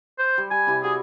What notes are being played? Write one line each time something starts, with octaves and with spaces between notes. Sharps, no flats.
C5
G3
G3 G#5
C3 E4 G4
G3 F#4 G#4